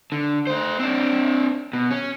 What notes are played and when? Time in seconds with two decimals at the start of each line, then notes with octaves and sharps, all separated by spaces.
0.12 D3
0.47 A3 C5
0.79 C4 D4
1.73 B2
1.91 C#4